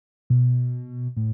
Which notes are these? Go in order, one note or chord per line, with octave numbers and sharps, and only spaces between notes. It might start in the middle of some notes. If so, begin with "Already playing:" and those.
B2
A2